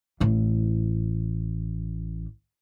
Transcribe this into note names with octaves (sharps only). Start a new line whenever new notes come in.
A1 E3